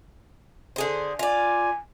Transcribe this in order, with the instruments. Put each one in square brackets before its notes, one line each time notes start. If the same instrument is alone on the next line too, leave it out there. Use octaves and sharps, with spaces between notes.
[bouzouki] D3 G#4 C5
[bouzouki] F4 D5 [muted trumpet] G#5